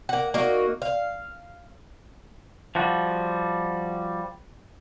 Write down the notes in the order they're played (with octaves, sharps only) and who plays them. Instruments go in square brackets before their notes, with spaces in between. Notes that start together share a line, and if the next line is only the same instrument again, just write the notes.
[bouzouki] A#3 F#5
A#3 D#4 F#4
F5
[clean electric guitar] F3 G3 F#4